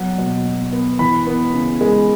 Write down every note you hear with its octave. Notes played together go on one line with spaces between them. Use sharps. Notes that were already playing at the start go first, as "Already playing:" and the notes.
Already playing: F#3 B3 F#5
B2
B2
B3
E3 B5
B3
C#3
G#3